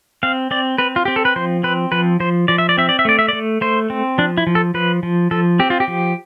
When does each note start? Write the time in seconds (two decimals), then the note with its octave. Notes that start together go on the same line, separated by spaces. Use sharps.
0.23 C4 F5
0.51 C4 D5
0.78 C4 B4
0.96 F4
1.05 C4 G4
1.16 A4
1.25 B4
1.36 F3 C5
1.63 C4 B4
1.92 F3 B4
2.20 F3 C5
2.48 F3 D5
2.58 E5
2.69 D5
2.77 C4 E5
2.89 D5
2.99 E5
3.05 A3 D5
3.19 E5
3.28 A3 D5
3.61 A3 C5
3.90 C4
4.18 F3 D4
4.38 E4
4.47 F3
4.55 A4
4.74 F3 B4
5.03 F3
5.31 F3 A4
5.59 C4 G4
5.70 F4
5.80 G4
5.88 F3